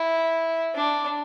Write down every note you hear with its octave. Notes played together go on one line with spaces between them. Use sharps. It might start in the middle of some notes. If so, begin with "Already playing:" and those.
Already playing: E4
D4